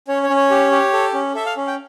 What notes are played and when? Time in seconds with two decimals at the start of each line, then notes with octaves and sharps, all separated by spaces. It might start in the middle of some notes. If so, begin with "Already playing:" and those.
0.08 C#4 C#5
0.23 C#5
0.30 C#4
0.37 C#5
0.50 G4
0.72 G4
0.93 A4
1.13 C#4
1.35 A4 E5
1.46 F5
1.57 C#4
1.67 G5